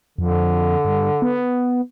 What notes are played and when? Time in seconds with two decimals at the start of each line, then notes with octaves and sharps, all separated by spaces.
0.18 F2 D3
0.85 G2
1.22 B3